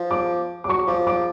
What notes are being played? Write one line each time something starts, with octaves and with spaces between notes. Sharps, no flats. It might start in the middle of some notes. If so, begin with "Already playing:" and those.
Already playing: F3
D6
D6
F#3 C#6
F3 D6
D6